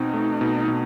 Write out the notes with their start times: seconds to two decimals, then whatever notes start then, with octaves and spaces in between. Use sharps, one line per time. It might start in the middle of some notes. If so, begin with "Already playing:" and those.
Already playing: B2 C4 D#4
0.14 A3
0.41 B2
0.68 B2